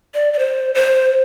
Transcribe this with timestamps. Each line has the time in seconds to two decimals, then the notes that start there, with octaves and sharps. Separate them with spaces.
0.14 D5
0.33 D5
0.39 C5
0.75 C5